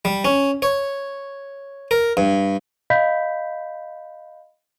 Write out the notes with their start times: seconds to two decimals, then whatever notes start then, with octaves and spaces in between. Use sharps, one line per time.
0.05 G3
0.25 C#4
0.62 C#5
1.91 A#4
2.17 G2
2.90 D#5 F5 B5 G6 B6